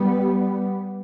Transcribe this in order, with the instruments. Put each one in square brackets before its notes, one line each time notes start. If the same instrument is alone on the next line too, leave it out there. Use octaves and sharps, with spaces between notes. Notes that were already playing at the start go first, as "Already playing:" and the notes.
Already playing: [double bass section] G3 B3